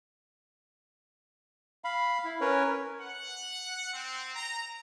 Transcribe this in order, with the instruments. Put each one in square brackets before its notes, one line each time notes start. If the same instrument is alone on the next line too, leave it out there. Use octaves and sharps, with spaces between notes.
[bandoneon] F5 B5
E4
C#4 A#4 B4 C#5
[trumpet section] F#5
C4
A#5